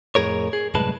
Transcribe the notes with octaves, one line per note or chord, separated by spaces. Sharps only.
F2 A2 G#4 A#4 C#5
G#4
C2 F#2 A2 G#3 B4 A5